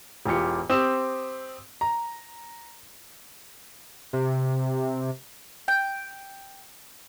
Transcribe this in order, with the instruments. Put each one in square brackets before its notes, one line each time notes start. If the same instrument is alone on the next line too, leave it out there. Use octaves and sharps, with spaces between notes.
[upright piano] E1 E3 F4 G4 C#7
C4 G4 D#6 E6 E7
A#5
[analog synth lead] C3
[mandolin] G5